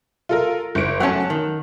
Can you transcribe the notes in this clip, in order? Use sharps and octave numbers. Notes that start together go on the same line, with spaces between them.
F4 A4 A#4
F#1 D7
F#3 A3 C#4 F#5 A5
D#3